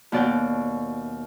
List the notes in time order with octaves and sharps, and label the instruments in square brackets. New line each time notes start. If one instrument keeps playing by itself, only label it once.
[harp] D#2 B2 D5 F#5 G5